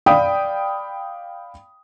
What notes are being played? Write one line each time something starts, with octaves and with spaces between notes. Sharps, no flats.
D5 F5 G5 B5 D#6